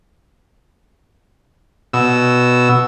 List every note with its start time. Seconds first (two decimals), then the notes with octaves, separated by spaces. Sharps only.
1.93 B2 E6